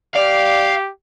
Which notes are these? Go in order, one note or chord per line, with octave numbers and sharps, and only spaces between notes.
G4 D5 F5